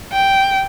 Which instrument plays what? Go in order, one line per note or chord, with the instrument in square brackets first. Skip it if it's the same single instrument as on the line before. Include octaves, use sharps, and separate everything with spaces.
[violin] G5